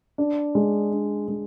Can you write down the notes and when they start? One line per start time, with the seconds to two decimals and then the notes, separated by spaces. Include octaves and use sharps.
0.18 D4
0.55 G#3
0.92 D4
1.28 G#3